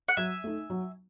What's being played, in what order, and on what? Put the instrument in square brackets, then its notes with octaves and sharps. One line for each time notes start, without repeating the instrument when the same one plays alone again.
[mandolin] F#5
[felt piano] F#3 [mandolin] E5 G#5
[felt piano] A3 D#4
F#3